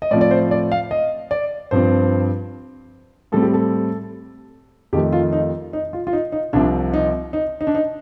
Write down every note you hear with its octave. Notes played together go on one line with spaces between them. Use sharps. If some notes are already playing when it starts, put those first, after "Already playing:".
D#5
A2 F3 C4 D5
D5
C5
D5
F5
D#5
D5
G2 F3 C4 C5
A2 G3 C4 A4
G4
A4
F2 D#3 A3 G4
F4
D#4
D#4
F4
F4
D#4
D#4
C2 C3 F3 C4 D4
D#4
D#4
D#4
D4
D#4